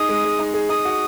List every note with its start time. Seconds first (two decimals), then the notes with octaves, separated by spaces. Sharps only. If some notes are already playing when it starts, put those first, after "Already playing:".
Already playing: D#4 G#4 D#6
0.09 G#3
0.25 G#3
0.39 D#4
0.54 G#4
0.69 D#4 D#6
0.85 F#4